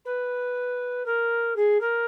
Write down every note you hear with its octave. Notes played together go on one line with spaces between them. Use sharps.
B4
A#4
G#4
A#4